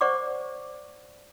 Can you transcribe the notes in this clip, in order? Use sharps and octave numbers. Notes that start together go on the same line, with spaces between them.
C5 D5 F#5 C#6 D6